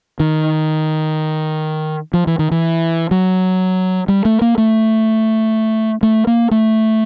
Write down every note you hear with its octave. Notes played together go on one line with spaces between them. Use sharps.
D#3
F3
E3
D#3
E3
F#3
G3
A3
A#3
A3
A3
A#3
A3